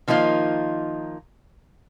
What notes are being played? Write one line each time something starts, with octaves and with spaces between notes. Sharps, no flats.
D#3 F3 A#3 D#4 F4